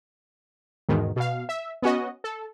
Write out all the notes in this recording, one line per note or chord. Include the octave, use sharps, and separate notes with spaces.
E2 G#2 B2 D#3
B2 F5
E5
B3 C#4 F#4 D#5
A4